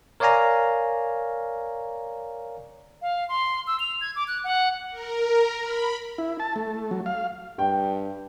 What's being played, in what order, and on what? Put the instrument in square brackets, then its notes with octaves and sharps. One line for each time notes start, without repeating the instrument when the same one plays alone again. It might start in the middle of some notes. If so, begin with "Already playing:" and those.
[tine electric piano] A#4 C#5 D5 F5 G#5 A#5
[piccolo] F5
C6
E6
F7
G#6
D6
F#6
F#5
[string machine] A#4
B5
[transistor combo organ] E4
A5
A3
F#3
F5
[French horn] G2 [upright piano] G5